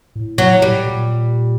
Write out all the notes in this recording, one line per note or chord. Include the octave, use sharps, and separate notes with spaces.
A2
F#3
G3
A#2